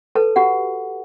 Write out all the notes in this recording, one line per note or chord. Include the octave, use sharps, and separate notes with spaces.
A4 B4 A5
F#4 G4 F#5